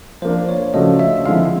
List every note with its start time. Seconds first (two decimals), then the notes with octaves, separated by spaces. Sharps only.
0.22 F3 A#3 D4 C5
0.49 C#5
0.74 C#3 F3 A3 D4 F#4 D#5
0.99 E5
1.26 D3 F3 G#3 C4 E4 F5